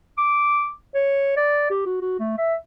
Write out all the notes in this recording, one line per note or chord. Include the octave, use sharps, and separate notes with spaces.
D6
C#5
D5
G4
F#4
F#4
A3
E5